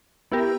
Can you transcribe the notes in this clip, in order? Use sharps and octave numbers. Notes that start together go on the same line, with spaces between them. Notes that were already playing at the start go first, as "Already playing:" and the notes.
B3 E4 G4 A#4